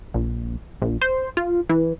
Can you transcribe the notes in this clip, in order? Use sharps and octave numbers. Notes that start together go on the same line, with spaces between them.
A#1
A#1
C5
F4
E3